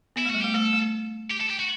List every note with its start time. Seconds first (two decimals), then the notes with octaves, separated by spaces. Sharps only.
0.16 B3 E4
0.25 A3
0.30 G3 F#4
0.41 A3 G4
0.54 A3 A4
0.73 A3
1.31 G4
1.41 A4
1.50 G4
1.59 F#4